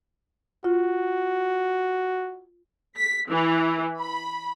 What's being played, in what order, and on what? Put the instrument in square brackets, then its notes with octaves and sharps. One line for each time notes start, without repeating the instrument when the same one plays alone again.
[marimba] F4 [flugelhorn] F#4
[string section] B6
E3
B5